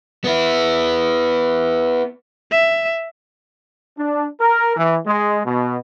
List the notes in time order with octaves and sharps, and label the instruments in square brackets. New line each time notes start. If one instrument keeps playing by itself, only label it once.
[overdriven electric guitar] B3 E4
[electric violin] E5
[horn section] D4
A#4
E3
G#3
B2